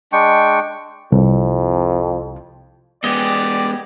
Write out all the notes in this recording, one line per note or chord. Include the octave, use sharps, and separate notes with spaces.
G#3 D4 G5 C#6
C2 F2
G#3 B3 G4 G#4 D5 D#5